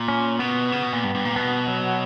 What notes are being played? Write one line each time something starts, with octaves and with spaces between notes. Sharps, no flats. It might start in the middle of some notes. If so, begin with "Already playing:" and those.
Already playing: A#2
C#4
B2 B3
C#3
B2
A#2
G2
G2
A#2
B2 B3
F#3